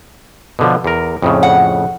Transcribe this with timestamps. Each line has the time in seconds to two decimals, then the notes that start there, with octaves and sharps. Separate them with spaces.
0.59 B2 D3 F3
0.84 E2 A#4
1.22 F2 A2 C#3
1.43 F#5